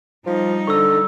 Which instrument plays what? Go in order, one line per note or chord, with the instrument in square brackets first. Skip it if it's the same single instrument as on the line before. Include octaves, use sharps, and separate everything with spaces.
[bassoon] F3 [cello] G3 D#4
[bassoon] D3 [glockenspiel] C#6 E6